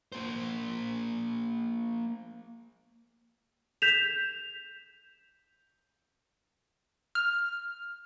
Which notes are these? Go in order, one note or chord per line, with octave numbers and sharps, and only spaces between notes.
A#3 C5
G6 B6 E7 F7
F6